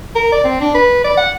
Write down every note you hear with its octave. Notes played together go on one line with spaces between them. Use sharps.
A#4
D5
C4
D4
B4
D5
F#5